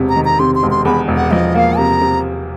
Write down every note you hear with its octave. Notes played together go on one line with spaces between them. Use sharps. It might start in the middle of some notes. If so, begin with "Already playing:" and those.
Already playing: E1 C3
A#5
D#3
A#5
C3 C6
C6
E1
C6
E2 B5
E1
F#5
F3 D#5
A#3 F5 F#5
C3 A#5
C3